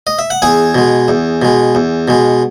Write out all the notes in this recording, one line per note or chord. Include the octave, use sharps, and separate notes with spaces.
D#5
E5
F#5
E2 G#4 G#5
B2 G#3
E2
B2 G#3
E2
B2 G#3